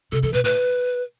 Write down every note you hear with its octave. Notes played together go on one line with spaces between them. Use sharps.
C3 A4
E3 A4
B2 B4
A2 B4